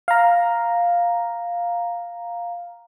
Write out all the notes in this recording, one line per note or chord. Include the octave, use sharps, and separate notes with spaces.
F5 A#5